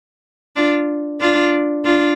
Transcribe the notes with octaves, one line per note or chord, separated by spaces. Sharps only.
D4 F4
D4 F4
D4 F4